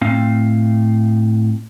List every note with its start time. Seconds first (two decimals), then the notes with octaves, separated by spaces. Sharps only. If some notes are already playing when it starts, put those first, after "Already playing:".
0.01 A2 C4 F5